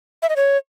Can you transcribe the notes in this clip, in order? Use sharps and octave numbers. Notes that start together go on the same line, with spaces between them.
E5
D#5
C#5